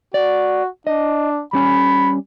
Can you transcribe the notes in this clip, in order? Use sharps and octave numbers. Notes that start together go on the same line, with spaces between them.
F#4 D5
D4 D#5
G3 C#4 G#5 B5